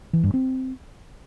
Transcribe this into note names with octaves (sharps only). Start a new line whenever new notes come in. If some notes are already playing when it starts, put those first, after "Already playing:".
E3
G2
C4